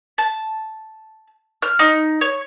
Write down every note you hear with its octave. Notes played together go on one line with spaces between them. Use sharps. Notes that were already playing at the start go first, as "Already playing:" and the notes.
A5
F6
D#4
C#5